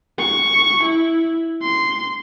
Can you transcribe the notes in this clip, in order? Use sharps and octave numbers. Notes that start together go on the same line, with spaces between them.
C#6
E4
C6